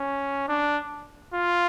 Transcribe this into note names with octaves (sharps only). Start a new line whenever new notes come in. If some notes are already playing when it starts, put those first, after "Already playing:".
Already playing: C#4
D4
F4